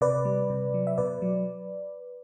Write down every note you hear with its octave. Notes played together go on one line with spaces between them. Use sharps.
C3 B4 D5
G3
C3
F#3
E5
B2 B4 D5
F#3